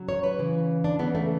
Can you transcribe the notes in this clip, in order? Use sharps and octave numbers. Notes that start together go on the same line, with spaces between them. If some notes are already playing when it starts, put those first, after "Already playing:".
Already playing: C#3 F#3
C#5
B4
C#3 E3
D4
C#3 E3 B3
A3